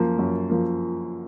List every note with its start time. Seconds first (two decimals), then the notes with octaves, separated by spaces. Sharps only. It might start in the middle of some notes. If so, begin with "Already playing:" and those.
Already playing: F#2 F3 A#3
0.19 F#2
0.49 F3 A#3